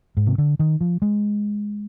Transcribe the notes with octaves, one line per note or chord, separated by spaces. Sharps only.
G#2
C3
D3
D#3
F3
G#3